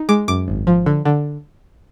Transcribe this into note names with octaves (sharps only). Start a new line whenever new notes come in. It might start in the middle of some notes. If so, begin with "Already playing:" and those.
Already playing: D#4
G#3 D6
F#2 D6
G#1
F3
D3
D3